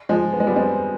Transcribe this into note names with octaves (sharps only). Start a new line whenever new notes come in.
F3 G#3
B3
G#3
G3 B3
G#3 C4